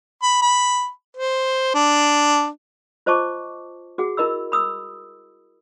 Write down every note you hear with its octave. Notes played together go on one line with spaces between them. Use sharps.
B5
B5
C5
D4
F4 C5 D#5 A5 C#6 D6
F#4 G#4 F#5
E4 A#4 D#5 B5 E6
B5 D#6 E6